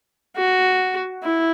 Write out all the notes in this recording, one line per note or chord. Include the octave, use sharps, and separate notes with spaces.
F#4
E4